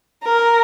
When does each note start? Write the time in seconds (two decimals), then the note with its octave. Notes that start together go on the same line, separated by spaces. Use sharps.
0.23 A#4